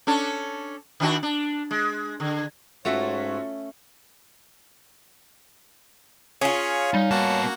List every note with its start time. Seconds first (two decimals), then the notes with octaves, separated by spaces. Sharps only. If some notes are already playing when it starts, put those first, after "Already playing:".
0.07 C#4 D4 A4
1.00 D#3 D4 F#4
1.23 D4
1.71 G#3
2.20 D3
2.85 G#2 A3 C#4 F4 F#4 C#5 E5
6.41 C#4 F4 G#4 C#5
6.94 G3 D#4
7.11 A#3 B3 F#4 F#5 A5